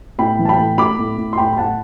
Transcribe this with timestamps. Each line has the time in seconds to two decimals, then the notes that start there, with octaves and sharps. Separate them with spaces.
0.19 A2 G5 B5
0.39 E3
0.45 A5
0.49 G5 B5
0.59 A2
0.78 A2 B5 D6
0.99 A2
1.18 A2
1.33 C6
1.38 A2 G5 B5
1.52 B5
1.57 A2 F#5 A5